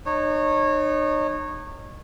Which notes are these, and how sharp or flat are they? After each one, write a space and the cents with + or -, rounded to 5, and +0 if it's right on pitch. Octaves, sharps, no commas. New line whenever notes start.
D#4 -35 C#5 -20